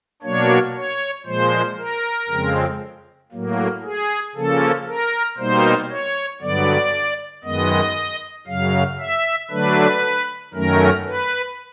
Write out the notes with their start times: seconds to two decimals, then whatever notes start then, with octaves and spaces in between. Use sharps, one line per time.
0.23 B2 F#3 A#3 D4 C#5
0.75 C#5
1.26 A#2 F3 G#3 C5
1.78 A#4
2.29 F2 C#3 F3 G#3 C4
3.32 A2 F#3 A#3
3.84 G#4
4.35 C#3 F3 A#3 C#4 A4
4.86 A#4
5.38 B2 G3 A#3 D#4 C5
5.90 C#5
6.41 G2 D3 F#3 B3 D5
7.44 F#2 D#3 G#3 B3 D#5
8.47 F#2 C#3 F#3 F5
8.99 E5
9.51 D3 F#3 A3 D4 B4
10.54 F#2 D#3 F#3 A3 C#4 A#4
11.06 B4